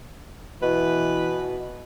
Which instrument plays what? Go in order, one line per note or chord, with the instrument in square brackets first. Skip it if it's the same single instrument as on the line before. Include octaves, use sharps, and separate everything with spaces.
[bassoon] B2 [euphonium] E3 [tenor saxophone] B4